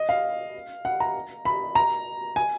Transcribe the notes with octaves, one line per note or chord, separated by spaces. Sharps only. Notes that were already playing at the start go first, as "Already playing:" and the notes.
Already playing: D#5
F5
F#5
A#5
B5
A#5
G#5